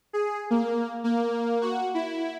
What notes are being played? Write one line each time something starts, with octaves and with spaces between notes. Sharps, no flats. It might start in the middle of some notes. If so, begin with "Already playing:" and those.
G#4
A#3
A#3
F#4
E4